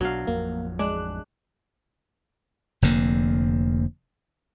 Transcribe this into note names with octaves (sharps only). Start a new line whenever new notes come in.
B1 B2 F#3 D4 F5
A1 F2 F3 A#3
G#3 D4 F#6
F1 F2 D3 A#3